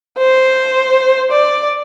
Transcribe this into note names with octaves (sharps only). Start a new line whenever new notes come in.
C5
D5